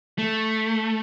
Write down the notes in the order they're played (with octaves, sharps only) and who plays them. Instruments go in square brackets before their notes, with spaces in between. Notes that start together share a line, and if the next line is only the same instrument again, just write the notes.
[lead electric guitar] A3